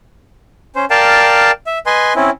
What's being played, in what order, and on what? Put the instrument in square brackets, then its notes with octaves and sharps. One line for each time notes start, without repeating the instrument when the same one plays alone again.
[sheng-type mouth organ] C#4 C5
A#4 D5 F5 G5 A5
E5
B4 D#5 G#5 C6
C4 C#4 E4